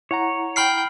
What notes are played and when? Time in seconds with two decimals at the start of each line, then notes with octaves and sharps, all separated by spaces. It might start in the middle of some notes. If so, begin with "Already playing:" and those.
0.11 E4 C#5 F#5 A#5
0.56 G5 B5 F6 C7